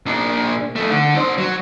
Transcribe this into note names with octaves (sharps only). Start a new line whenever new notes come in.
A#2 D4
F3 A3
D3
D4 C5
F#3